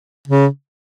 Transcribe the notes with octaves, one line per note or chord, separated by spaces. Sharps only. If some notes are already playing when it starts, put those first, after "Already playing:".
C#3